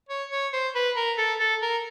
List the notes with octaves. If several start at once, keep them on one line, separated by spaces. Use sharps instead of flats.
C#5
C#5
C5
B4
A#4
A4
A4
A#4